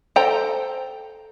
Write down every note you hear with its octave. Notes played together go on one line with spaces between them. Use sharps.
A4 C5 G5 A#5